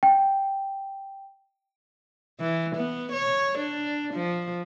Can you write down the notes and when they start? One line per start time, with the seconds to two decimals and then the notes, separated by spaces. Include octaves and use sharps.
0.03 G5
2.40 E3
2.76 B3
3.13 C#5
3.59 D4
4.14 F3